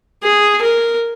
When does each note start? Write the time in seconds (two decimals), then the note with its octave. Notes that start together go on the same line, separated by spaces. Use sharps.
0.23 G#4
0.62 A#4